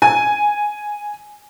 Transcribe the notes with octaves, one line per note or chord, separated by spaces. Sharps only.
G#5